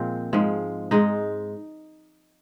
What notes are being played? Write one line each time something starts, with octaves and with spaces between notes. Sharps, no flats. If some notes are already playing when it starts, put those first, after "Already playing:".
Already playing: A#2 F3 G#3 C4
G#2 F3 G#3
G#2 G#3 D#4